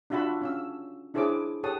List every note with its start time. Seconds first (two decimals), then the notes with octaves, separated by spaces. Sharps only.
0.10 D4 F4 F#4 E5 A5 B5
0.42 C#4 F5 E6
1.14 D4 E4 G#4 C5 C#5 D6
1.63 G4 A4 C#5 F#5 A5 D#6